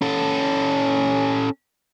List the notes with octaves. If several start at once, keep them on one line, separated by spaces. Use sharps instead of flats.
C#4 A4